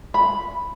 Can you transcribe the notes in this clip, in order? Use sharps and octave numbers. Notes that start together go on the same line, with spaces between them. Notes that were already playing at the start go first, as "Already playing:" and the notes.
B5